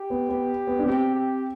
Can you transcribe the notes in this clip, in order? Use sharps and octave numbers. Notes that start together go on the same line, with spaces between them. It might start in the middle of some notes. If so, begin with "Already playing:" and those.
Already playing: G4
B3
B3
B3
D4
C4 G4
G4